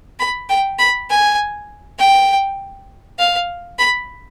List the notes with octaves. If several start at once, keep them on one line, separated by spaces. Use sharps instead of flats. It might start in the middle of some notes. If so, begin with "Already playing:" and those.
B5
G5
B5
G#5
G5
F5
B5